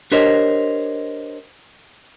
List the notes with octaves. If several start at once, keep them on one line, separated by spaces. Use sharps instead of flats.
D4 G4 A#4 C5 C#5 D#5